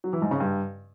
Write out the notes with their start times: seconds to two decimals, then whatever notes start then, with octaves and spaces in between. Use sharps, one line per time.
0.04 F#3
0.13 E3
0.22 G#2
0.31 C#3
0.40 G2